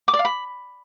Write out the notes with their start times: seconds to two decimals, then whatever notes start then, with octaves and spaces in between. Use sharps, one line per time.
0.08 D6
0.14 D5
0.19 F5
0.25 B5